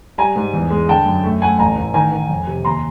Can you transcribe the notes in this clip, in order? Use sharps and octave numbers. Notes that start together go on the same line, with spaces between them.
G3 G#5 A#5
G#2
E2
G#3
D3 G5 A5
F#2
A3
A3 F#5 G#5
A1 G#5 A#5
A1
D#3 G#5 A#5
D#3
F2
C3
D#2 A#5 C6